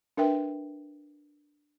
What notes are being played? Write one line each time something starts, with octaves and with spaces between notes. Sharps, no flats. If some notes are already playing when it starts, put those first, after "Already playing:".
D4 A#4 B4 E5 G5